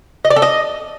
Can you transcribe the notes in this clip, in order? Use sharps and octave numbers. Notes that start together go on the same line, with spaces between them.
D#5
D5
A4
D#5